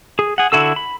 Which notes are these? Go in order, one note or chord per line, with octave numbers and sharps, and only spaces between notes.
G#4
G#4 F#5
D3 E4 F#4 A4 E6
B5